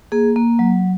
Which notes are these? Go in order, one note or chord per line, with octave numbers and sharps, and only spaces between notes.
A#3 G#4
A#3
F#3